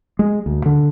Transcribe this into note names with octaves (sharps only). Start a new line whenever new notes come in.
G#3
D2
D3